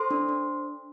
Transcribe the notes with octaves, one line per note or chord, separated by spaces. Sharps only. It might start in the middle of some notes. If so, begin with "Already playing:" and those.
Already playing: A4 C5 C6
D4
D4